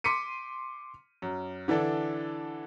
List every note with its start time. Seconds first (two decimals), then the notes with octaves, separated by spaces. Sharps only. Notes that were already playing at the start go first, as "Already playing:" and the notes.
0.04 C6 D6 B6 C#7 D#7
1.22 F#2
1.68 D3 E3 D4 A4